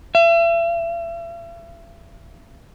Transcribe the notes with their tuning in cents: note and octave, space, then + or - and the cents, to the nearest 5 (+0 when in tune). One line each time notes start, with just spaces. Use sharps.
E5 +40